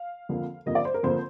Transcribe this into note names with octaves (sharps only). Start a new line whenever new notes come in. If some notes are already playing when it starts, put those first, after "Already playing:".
Already playing: F5
F2 D3 F3 A#3
F2 D3 F3 A#3 D#5
D5
C5
A#4
F2 D3 F3 A#3 C5